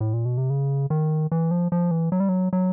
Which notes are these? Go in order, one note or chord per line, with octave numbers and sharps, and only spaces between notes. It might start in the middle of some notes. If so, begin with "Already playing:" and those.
A2
A#2
B2
C3
C#3
D#3
E3
F3
F3
E3
F#3
G3
F#3
F#3